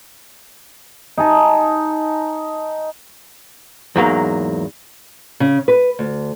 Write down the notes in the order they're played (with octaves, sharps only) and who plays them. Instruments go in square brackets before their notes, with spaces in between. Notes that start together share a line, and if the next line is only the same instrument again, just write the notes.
[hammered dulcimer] D#4 G#5 A5
[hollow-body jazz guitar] E2 G#2 F#3 A#3
[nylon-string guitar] C#3
B4
D2